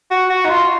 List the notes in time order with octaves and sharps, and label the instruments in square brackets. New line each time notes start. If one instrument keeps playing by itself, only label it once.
[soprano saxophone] F#4
F#4
D#4
F4